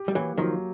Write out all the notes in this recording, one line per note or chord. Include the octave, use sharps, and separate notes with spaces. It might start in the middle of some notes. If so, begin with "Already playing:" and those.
Already playing: G4
G3
E3 F#3 A#3
D#3 F3 F#3